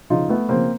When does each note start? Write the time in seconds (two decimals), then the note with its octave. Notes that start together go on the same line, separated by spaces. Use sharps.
0.10 C#3 F3 D#4 F4
0.29 A3 B3
0.49 C#3 F3 A#3 C4